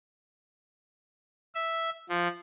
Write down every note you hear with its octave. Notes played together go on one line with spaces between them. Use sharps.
E5
F3